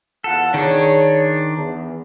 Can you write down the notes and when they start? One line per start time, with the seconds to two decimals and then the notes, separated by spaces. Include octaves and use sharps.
0.24 E2 F4 A4 F#5
0.54 D#3 D4 G#4 C#5
1.55 E2